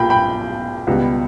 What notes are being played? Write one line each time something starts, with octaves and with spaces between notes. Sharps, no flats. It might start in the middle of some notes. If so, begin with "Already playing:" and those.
Already playing: B1 A#2 A#3 G5 B5
G5 B5
C#2 B2 G3 B3